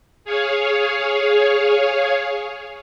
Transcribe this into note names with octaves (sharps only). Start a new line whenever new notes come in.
G#4 C#5 F5